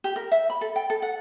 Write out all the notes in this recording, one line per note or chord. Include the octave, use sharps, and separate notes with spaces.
G4
A#4
E5
B5
A4
G5
A4
F#5